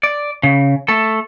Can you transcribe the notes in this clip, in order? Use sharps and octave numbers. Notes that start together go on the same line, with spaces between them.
D5
C#3
A3 A4